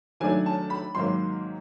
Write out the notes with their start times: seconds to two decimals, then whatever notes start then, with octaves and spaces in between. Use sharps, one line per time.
0.20 D#3 F#3 A3 D4 G#5
0.46 A5
0.70 B5
0.95 G#2 D#3 F#3 A#3 C6